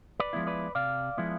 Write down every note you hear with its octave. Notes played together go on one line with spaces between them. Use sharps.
B4 D5
F3 G#3 B3 E4
B4 D5
C3 D5 F5
F3 G#3 B3 E4